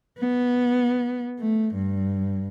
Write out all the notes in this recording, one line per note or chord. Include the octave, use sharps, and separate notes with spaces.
B3
A3
G2